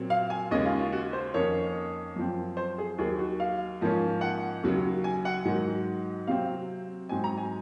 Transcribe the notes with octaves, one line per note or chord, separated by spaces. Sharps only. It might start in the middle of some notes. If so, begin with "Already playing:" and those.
Already playing: A#2 F#3 C4
F5
G#5
D#2 C#3 G#3 C#4 D#5
F4
F4
F#4
C5
F2 D#3 A#3 C#4 C#5
F#2 F3 C4
C5
G#4
D#2 D#3 F#3 G#4
F#4
F5
G#2 F3 A#3 C#4
F#5
D#2 C#3 F#3
G#5
F#5
G#2 D#3 F#3
C3 F#3 C4 F5
G#2 F#3 C4 G#5
A#5
G#5